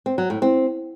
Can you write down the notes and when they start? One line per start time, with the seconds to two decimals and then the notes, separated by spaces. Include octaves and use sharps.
0.06 C4
0.18 F#3
0.30 A2
0.42 C4